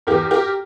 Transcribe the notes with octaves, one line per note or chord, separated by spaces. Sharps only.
E2 E3 G4 A#4
G4 A#4